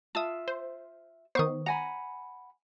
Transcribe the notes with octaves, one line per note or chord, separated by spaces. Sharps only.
F4 E5 A5 D#6
C5
D#3 B3 C5 C#6 D#6
F#5 G#5 A#5 B5